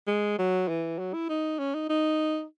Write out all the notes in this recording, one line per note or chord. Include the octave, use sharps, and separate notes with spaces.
G#3
F#3
E3
F#3
E4
D#4
C#4
D#4
D#4